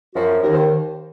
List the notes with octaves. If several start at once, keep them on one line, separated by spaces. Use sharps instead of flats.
F#2 F3 F#4
D#2 D#3 A#4 C5